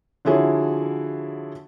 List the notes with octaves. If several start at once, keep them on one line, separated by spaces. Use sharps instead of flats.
D3 F3 E4 F#4 G#4 C#5